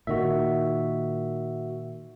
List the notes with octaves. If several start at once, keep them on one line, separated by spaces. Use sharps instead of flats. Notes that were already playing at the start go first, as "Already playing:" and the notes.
A#2 D#3 F#4 E5